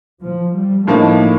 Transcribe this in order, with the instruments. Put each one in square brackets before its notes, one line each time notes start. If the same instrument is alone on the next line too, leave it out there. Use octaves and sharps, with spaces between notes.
[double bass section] F3
G3
[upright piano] A2 F3 A#3 D#4 [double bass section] A3